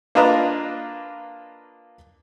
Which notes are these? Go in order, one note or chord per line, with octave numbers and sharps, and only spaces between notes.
A#3 D4 F4 B4 D#5 A#5